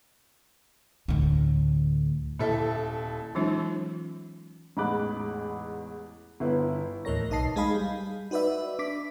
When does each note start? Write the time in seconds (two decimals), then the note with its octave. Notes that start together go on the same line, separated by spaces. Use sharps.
1.08 D2 A2
2.39 D#1 E4 A4 E5
3.35 E3 F#3 G#3 C#4 D#4 F4
4.77 A1 E2 G#2 B5 D6 F#6
6.40 G1 B3 E4 B4
7.05 D#2 A2 E3 A#4 C#5 A#6
7.30 B1 D#4 D#5 A5 C7
7.56 G#3 D#4 G#4 D#5 F5 B5
7.74 G3
8.31 D#4 F#4 B4 D5 E5
8.79 D4 D6 B6